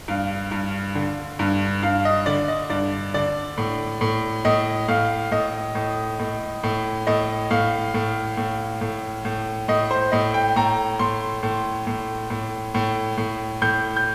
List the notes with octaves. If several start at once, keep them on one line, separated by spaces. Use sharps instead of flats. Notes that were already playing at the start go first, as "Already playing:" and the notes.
G2 F5
G2
D3
G2
G2 F5
D#5
D3 D5
D#5
G2 D5
D3 D5
A2
A2
A2 D#5
A2 F5
A2 D#5
A2
A2
A2
A2 D#5
A2 F5
A2
A2
A2
A2
A2 D#5
C5
A2 D#5
G5
A2 A#5
A2 C6
A2
A2
A2
A2
A2
A2 G6
G6